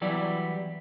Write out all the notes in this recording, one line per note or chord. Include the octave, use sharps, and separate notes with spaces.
E3 F#3 G3 B3 E4 D5